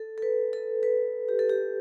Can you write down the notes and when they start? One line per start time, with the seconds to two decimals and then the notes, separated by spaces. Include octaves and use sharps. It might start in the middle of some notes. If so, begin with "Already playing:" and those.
Already playing: A4
0.18 A4
0.22 B4
0.53 A4
0.83 B4
1.29 G4
1.39 A4
1.49 G4